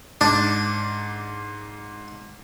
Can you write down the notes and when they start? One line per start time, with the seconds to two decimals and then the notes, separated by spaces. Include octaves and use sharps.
0.21 G#2 D4